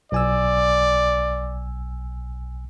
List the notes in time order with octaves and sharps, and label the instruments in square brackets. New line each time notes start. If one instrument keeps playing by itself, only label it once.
[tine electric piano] B1 G#5 E6 [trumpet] D5